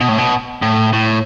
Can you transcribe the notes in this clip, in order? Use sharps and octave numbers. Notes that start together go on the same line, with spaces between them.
B2
A2
B2
A2
A2